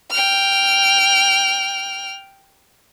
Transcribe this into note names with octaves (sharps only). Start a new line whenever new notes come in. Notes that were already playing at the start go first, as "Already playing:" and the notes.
G5 F6